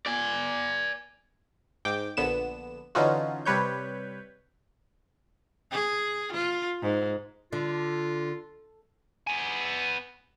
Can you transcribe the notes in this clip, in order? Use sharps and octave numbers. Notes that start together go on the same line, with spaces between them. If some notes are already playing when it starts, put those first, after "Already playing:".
D5 G#5
G#2 G5 D6
A#1 D3 B3 E7
D3 E3 C#4 D#4 F4 F#4
C3 G3 B4 C#5 G6
G#4
F4
G#2
D3 F4
B3 G#5